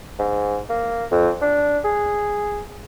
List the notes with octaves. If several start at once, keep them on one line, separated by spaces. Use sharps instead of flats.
G#2
A#3
F2
D4
G#4